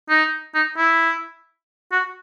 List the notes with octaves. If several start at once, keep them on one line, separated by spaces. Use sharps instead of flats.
D#4
D#4
E4
F#4